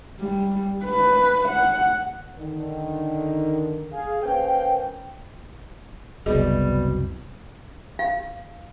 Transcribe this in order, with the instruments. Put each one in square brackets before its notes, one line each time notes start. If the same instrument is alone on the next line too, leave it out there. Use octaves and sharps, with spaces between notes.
[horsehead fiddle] G3
B4
F#5
[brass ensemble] D3 D#3
G#4 F5
A#3 C#4 B4 C5 F5 G5
[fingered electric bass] F#1 C2 [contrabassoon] B2 [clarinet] G3 [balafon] G#4 D#5
[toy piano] F5